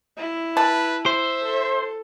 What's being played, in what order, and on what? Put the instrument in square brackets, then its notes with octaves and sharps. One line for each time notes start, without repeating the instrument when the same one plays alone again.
[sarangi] E4
[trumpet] B4 [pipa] A5
[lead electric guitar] C5 [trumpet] E5
[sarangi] A4